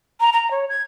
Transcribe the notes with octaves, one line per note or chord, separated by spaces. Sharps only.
A#5
A#5
C#5
G#6